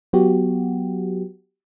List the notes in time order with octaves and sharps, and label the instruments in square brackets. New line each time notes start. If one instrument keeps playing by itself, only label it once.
[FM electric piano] F#3 B3 F#4 G4